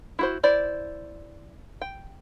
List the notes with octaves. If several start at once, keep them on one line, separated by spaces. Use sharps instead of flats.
E4 F#4 C5
E4 C5 D5
G5